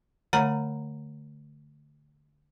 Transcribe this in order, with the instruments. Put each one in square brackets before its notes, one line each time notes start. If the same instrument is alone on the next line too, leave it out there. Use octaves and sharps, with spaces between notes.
[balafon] D3 A3 C#5 F#5 A#5 B5